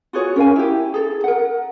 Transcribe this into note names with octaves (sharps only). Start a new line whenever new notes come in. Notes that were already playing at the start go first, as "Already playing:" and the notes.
F4 F#4 G#4 C#5
C#4 A#4 F5 G#5
E4 G4
G#4 A4
A#4 F#5